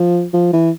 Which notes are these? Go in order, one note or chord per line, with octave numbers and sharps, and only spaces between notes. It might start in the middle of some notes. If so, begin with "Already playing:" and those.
Already playing: F3
F3
E3